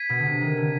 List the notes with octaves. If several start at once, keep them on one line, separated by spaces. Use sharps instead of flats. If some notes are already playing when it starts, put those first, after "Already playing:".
Already playing: G#6 B6 D#7
B2
D3
C3
D#3
D3